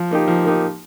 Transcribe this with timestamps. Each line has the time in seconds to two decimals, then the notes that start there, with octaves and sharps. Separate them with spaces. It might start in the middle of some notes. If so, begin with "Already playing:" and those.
Already playing: F3
0.11 A#3 D#4 G4
0.28 F3
0.45 A#3 D#4 G4